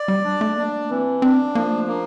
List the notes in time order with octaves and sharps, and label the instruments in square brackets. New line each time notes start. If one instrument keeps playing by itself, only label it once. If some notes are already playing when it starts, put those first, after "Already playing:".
Already playing: [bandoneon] D5
[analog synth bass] G3
[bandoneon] D4
[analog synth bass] A3
[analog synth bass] A#3 [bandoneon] D4
[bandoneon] E3 [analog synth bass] C4
[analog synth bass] C4 [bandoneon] D4
[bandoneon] F3 [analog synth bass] A#3
[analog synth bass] A3
[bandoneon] A#3 [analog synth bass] D4